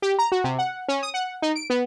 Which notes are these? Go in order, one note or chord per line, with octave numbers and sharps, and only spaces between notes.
G4
A#5
F#4
C3
F#5
C#4
D#6
F#5
D#4
D7
B3